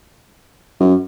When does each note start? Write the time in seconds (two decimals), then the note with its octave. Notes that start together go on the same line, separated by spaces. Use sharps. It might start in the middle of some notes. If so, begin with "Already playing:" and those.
0.80 F#2